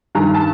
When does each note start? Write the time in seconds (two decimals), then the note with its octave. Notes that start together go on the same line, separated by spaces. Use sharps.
0.15 G2 D#3 A#5
0.34 A5